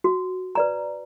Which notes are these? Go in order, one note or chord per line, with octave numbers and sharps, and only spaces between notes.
F#4
B4 D5 A#5